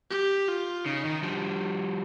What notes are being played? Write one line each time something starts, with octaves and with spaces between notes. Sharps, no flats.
G4
F4
C#3 D#4
D#3
F3 G3 D4